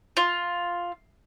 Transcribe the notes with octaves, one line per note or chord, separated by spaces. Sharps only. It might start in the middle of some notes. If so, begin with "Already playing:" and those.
F4